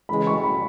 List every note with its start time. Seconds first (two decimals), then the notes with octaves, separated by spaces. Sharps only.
0.09 C#3 E3 G#3 B5
0.27 C#6
0.43 B5